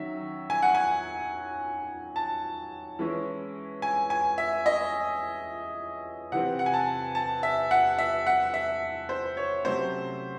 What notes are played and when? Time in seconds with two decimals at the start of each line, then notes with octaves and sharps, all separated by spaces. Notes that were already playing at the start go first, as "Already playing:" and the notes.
Already playing: D#3 F#3 C#4 E5
0.50 G#5
0.62 F#5
0.75 G#5
2.16 A5
2.99 E3 G#3 C#4 E4
3.82 G#5
4.10 G#5
4.38 E5
4.66 D#5
6.32 C3 E3 C4 F#5
6.59 F#5
6.66 G#5
6.74 A5
7.15 A5
7.43 E5
7.71 F#5
7.98 E5
8.27 F#5
8.54 E5
9.09 C5
9.37 C#5
9.65 C3 F#3 A3 C#4 C5